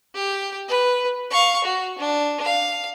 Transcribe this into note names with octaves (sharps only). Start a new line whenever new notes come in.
G4
B4
F5 C#6
F#4
D4
F5